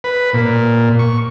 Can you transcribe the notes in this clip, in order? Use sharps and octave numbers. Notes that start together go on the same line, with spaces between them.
B4
A#2
C#6